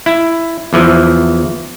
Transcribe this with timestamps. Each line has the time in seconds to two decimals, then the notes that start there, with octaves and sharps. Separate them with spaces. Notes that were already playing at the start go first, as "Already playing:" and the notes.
0.06 E4
0.73 E2 E3 F3